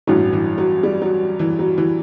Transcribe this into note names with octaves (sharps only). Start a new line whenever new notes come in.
A1 G2 E3 F#3
E3
F#3
G3
F#3
E3
F#3
E3